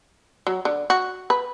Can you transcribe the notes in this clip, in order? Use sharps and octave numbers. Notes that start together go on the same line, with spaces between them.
F#3
D3
F#4
B4